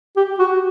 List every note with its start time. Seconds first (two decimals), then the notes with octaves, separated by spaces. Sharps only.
0.16 G4
0.39 F#4